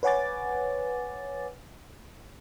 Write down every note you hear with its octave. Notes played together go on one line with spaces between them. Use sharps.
B4 C#5 F#5 G#5 D6 A6